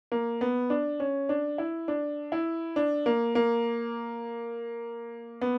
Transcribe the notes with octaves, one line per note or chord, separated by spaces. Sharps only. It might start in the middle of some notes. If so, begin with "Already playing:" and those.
A#3
B3
D4
C#4
D4
E4
D4
E4
D4
A#3
A#3
B3